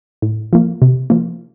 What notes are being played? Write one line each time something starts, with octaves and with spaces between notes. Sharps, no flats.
A2
F3 A#3
C3
F3 A#3